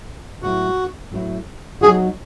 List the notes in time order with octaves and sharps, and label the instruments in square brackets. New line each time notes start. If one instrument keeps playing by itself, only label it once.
[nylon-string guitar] A2 F#3 B3 E4 [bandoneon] F#4
[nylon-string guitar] A2 F#3 B3 E4
[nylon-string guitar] F#3 B3 D#4 F#4 [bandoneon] G#4